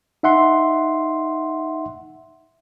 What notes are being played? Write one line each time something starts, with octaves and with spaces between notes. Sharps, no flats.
D#4 E5 F#5 C6